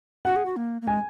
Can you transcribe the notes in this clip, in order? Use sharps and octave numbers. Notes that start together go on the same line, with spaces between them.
F#4 F#5
G#4
F#4
A#3
A#3
G#3 G#5